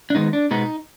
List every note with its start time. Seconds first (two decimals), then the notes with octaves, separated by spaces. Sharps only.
0.10 D4
0.15 D#3 G#3 B3 D#4
0.33 D4
0.51 B2 G#3 B3 D#4